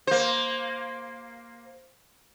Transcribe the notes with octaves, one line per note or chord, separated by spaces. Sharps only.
A#3 C5